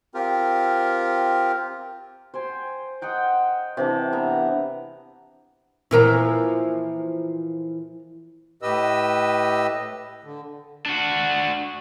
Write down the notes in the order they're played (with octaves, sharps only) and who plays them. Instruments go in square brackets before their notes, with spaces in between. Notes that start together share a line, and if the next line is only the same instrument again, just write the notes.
[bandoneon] C4 F4 G4 A#4
[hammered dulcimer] C5 G5 G#5
D#5 F#5 G5 A#5
C3 E3 D4 A5
B3 E5 A#5
[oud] A#2 E3 F3 [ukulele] E4 A#4 A#5
[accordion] A2 G4 B4 D#5 E6
D3
[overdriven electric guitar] D4 F#4